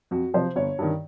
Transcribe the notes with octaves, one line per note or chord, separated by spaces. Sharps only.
F2 F#4
C3 F3 C5
G1 C#5
G2 D#3